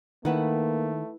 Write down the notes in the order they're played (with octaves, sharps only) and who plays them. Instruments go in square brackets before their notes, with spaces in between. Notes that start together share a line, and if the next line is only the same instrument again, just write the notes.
[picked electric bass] D#3 [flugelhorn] A3 [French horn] A#3 [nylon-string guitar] E4 B4 F#5